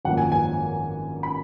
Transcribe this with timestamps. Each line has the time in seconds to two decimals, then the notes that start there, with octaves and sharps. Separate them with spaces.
0.05 G#1 F#2 F3 A#3 F#5
0.18 G#5
0.32 G#5
1.23 B5